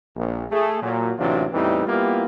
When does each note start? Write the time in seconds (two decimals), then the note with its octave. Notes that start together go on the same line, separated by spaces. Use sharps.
0.16 A#1
0.51 A3 G#4
0.82 A#2 F#3
1.18 A1 C3 E3 F#3 D4 F4
1.52 E2 A2 E3 G3 C4 D#4
1.86 G3 A#3 B3 E4 F4 G4